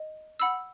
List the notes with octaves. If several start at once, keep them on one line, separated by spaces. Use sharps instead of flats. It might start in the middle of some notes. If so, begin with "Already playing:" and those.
Already playing: D#5
F#5 B5 E6